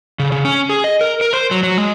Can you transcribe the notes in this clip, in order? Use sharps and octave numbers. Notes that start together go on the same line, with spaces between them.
C#3
C#3
C#4
G#4
D#5
A#4
A#4
C5
F#3
F#3
G#3